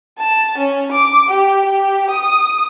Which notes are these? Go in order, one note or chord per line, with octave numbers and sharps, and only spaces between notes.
A5
C#4
D6
G4
G4
D#6